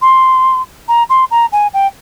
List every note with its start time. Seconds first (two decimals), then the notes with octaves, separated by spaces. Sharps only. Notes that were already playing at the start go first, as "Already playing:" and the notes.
0.01 C6
0.88 A#5
1.09 C6
1.31 A#5
1.52 G#5
1.73 G5